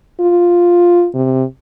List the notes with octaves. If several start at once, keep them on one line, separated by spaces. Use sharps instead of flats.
F4
C3